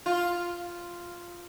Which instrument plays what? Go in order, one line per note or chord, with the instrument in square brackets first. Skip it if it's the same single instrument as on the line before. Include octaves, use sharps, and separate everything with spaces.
[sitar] F4